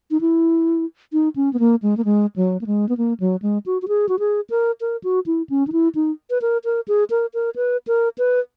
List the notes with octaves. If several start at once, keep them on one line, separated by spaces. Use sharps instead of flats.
D#4
E4
D#4
C#4
B3
A#3
G#3
A#3
G#3
F#3
A#3
G#3
B3
A#3
F#3
G#3
F#4
F#4
G#4
F#4
G#4
A#4
A#4
F#4
E4
C#4
D#4
E4
D#4
B4
A#4
A#4
G#4
A#4
A#4
B4
A#4
B4